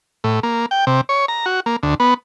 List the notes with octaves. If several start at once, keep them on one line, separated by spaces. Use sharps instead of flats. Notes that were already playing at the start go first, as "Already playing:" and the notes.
A2
A#3
G5
C3
C#5
A#5
F#4
A#3
D2
B3